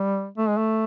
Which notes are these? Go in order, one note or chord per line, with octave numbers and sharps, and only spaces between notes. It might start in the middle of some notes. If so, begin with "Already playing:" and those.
Already playing: G3
A3
G#3
A3